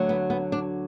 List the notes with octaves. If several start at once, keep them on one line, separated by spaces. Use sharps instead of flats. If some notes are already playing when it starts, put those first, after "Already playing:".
Already playing: D2 D3 F#3
B3
B3
D4